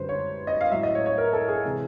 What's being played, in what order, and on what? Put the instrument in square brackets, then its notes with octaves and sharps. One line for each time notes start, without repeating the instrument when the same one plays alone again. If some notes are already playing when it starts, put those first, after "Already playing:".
Already playing: [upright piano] F#2 D3 G3 B4 C5
C#5
D#5
F5
A2 F#3 E5
D#5
C#5
C#5
A#4
A4
G#4
C3 E3 G#4